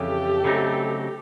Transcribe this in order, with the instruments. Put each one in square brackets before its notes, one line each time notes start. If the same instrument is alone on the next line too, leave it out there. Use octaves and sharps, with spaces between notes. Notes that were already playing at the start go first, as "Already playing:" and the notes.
Already playing: [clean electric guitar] F2 C#3 E3 [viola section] G4 A4
[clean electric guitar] C#3 F#3 A3 C4 D#4